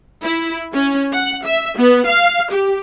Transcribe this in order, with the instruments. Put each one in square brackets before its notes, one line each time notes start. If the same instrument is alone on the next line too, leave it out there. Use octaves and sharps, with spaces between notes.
[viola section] E4
C#4
F#5
E5
B3
F5
G4